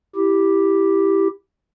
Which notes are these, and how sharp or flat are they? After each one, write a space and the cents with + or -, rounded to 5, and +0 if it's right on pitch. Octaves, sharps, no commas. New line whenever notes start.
E4 +0 G4 +0